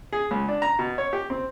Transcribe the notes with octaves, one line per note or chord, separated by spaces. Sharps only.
G#4
C#2
D4
A#5
B2
C#5
G4
C4